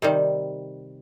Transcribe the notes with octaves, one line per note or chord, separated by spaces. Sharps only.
C3 D#3 G3